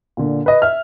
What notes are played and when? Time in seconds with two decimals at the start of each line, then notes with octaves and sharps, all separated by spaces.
0.17 A#2 D3
0.46 B4 D#5
0.62 E5 F6